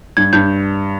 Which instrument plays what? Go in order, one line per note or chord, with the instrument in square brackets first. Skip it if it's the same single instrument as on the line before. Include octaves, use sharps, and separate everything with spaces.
[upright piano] G2 [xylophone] G#6
[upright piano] G2 [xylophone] G6